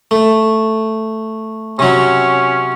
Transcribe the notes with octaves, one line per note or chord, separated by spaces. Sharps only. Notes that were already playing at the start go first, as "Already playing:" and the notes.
A3
C3 F#3 C#4